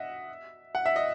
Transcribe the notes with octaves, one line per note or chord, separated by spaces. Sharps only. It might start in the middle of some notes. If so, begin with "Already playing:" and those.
Already playing: D#5 E5 F#5
F#5
E5
D#5